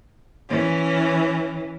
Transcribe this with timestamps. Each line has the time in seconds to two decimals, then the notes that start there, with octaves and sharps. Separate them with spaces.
0.48 E3 C#4